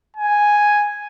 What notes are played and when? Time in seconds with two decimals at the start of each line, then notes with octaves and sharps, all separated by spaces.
0.16 G#5